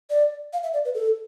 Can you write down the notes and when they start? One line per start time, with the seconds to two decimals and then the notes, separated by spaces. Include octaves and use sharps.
0.10 D5
0.53 F5
0.63 E5
0.73 D5
0.85 B4
0.95 A4